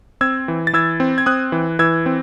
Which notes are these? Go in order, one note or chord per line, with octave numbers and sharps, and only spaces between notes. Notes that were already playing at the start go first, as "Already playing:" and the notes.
C4 E6 G#6
E3
A6
E3 E6 G#6
C4
G#6
C4 D#6 F#6
E3
E3 E6 G#6
C4